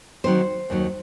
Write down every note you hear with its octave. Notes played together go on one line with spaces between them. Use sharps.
D#3 F#3 C4 D#4 C5
D#2 D#3 F#3